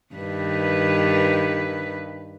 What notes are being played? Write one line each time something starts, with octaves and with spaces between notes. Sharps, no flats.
G2 D#3 B4